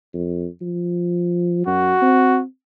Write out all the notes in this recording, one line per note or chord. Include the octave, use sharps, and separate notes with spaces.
F2
F3
F#2 F#4
C4